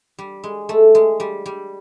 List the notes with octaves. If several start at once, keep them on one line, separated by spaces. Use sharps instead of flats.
G3
G#3
A3
G#3
G3
G3